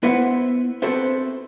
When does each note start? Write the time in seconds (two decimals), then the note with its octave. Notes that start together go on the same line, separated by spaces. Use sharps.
0.03 B3 E4 B4 C5 E5 F#5
0.82 C4 F#4 A4 B4 C5 E5